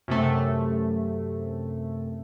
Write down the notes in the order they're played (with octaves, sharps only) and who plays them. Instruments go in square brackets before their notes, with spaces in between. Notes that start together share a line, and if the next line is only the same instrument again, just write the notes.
[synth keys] F#2 C3 A3